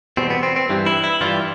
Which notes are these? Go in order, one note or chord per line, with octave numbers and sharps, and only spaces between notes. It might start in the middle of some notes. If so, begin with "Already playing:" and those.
E2 B2 G3 C4
B3
C4
C4
G2 E3 G3
E4
E4
G2 E3 G3 F4